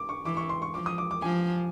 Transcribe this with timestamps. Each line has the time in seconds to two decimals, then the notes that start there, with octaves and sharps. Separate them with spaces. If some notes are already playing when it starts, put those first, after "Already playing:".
Already playing: D6
0.09 C#6
0.25 E3 D6
0.37 C#6
0.49 C6
0.62 C#6
0.74 F3 D6
0.86 D#6
0.98 D6
1.11 D6
1.22 F3 G#5